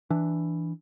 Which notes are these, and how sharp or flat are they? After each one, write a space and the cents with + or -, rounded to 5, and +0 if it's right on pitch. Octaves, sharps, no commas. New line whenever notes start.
E3 +0 D4 +5